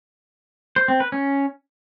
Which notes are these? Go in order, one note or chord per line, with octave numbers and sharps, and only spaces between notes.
C5
C4
B4
C#4